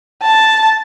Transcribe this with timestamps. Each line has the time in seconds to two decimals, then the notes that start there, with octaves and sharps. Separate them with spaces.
0.22 A5